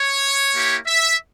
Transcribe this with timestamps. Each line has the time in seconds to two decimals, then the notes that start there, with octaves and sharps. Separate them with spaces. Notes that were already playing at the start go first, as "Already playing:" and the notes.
Already playing: C#5
0.54 A#3 E4 G4
0.86 E5